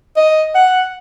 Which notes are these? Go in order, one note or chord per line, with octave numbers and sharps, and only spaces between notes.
D#5
F#5